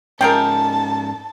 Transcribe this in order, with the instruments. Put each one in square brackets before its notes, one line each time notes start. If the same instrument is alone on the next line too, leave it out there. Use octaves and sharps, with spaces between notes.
[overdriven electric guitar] G#2 C#4 [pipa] F3 G#3 A#4 [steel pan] G5 [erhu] A5